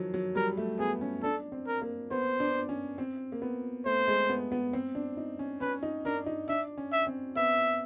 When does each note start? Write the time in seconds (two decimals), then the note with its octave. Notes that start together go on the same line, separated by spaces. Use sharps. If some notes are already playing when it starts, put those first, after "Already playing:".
Already playing: D#3 F3 F#3
0.14 F#3
0.36 G3 A#4
0.57 A3
0.79 B3 G#4
1.01 C#4
1.23 D4 A4
1.52 C4
1.67 A#4
1.82 A#3
2.11 B3 C5
2.40 D4
2.69 C#4
2.98 C4
3.32 A#3
3.42 B3
3.85 A3 C5
4.08 G#3
4.29 B3
4.52 B3
4.73 C4
4.95 D4
5.17 D#4
5.39 C#4
5.61 C#4 B4
5.83 D#4
6.05 D4 A#4
6.26 D#4
6.48 D4 E5
6.78 C#4
6.92 E5
7.07 C4
7.36 B3 E5